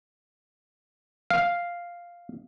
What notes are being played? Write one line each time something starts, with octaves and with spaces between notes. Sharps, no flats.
F5